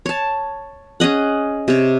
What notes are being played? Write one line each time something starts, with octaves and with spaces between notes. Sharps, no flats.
C#5 A5
C#4 G#4 D#5 F#5
C3 C#5